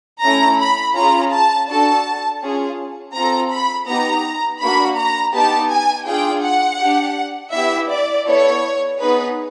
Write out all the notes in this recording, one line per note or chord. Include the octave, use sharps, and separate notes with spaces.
A3 C#4 E4 A#5
B5
C#4 F4 G#4 A#5
A5
D4 F#4 A4 A5
C#4 F4 G#4
C4 F4 A4 A#5
B5
B3 D#4 G4 A#5
A#3 D4 F#4 B5
A#5
B3 D#4 G4 A5
G#5
D4 F4 G#4 G5
F#5
D4 G4
B3 E4 G4 E5
D5
B3 E4 A4 C#5
B3 D#4 G#4 B4